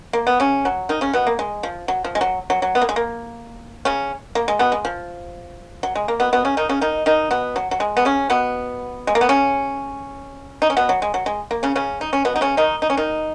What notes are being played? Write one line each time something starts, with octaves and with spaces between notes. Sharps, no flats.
A#3
B3
C#3 C#4
F#3
D#3 D#4
C#3 C#4
B2 B3
A#3
G#3
F3
F#3
F3
G#3
F#3
F#3
F#3
B3
A#3
G#3
A#3
C#3 C#4
A#3
G#3
B2 B3
G#3
F3
F#3
G#3
A#3
B2 B3
B2 B3
C#3 C#4
D#3 D#4
C#3 C#4
D#3 D#4
D#3 D#4
B2 B3
F#3
F#3
G#3
B3
C#3 C#4
B2 B3
G#3
A#3
B3
C#3 C#4
D#4
C#4
B2 B3
F#3
G#3
F#3
G#3
A#3
C#3 C#4
C#3 C#4
D#4
C#4
B2 B3
D#4
C#3 C#4
D#3 D#4
D#4
C#4
D#3 D#4